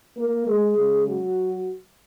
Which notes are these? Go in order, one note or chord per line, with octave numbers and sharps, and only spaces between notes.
A#3 A#4
G#3 G#4
C#3 G#3
F#3 F#4